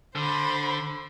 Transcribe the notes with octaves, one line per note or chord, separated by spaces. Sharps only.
D3 C5 B5